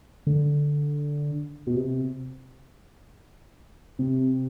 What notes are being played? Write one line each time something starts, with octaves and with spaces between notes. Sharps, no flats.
D3
B2
C3
C3